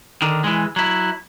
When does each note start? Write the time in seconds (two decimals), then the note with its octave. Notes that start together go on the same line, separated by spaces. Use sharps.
0.22 D3 D#3
0.44 E3 G#3
0.76 F#3 E4